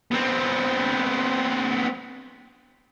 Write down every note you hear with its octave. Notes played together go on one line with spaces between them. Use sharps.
B3 C4